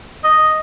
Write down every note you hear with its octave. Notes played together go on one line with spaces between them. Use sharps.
D#5